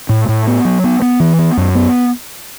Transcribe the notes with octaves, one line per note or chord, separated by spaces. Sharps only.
A2
A2
B3
F#3
B3
B3
E3
B3
F#2
B3